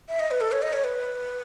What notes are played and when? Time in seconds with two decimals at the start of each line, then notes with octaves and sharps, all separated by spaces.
0.08 E5
0.20 D#5
0.31 B4
0.41 A4
0.52 C#5
0.62 D#5
0.73 C#5
0.84 B4